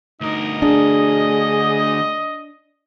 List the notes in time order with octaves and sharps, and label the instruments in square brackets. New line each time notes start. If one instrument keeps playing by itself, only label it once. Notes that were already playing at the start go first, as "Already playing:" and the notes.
[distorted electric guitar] D2 A#4 [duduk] D#4 [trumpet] D#5
[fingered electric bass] D4 [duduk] G#4